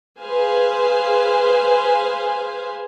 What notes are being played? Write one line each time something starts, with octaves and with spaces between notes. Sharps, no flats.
G#4 B4 C5 F5 G#5